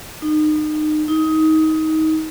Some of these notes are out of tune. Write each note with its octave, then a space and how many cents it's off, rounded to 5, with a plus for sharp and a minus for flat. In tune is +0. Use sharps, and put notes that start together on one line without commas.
D#4 -30
D#4 +20